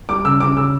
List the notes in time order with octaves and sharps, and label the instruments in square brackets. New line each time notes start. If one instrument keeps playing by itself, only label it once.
[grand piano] G3 D6
C#3 E6
C#3 D6
C#3 E6